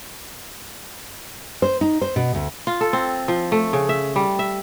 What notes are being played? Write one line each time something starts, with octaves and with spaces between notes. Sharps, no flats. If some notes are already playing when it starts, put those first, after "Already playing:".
C5
D#4
C5
B2
D2
F4
A4
C4
F3
A3
C#3
E5
G3
E5